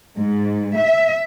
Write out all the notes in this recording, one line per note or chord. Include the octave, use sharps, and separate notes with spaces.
G#2
E5